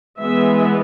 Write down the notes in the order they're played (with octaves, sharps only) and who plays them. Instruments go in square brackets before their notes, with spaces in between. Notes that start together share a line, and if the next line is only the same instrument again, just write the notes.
[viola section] E3 G#3 B3 E5